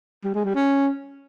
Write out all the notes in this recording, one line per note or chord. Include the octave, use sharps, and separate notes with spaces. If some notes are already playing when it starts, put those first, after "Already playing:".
G3
G#3
G3
C#4